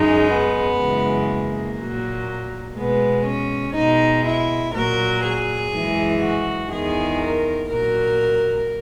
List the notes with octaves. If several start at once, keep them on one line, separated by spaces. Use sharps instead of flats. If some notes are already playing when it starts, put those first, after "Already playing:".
Already playing: F#2 C#3 G#3 D#4
B3
F#2 C#3 E3 G#3
A#3
A#2 F#3
B2 G#3 B3
C#4
B2 G#3 D#4
E4
A#2 F#3 A#4
G#4
F#2 E3 G#3
F#4
E2 D#3 G#3 G#4
A#4
A#2 F#3 A#4